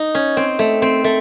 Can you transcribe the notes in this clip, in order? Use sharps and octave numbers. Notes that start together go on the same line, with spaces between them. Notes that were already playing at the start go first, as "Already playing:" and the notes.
Already playing: D#4
C#4
C4
A3
C4
A3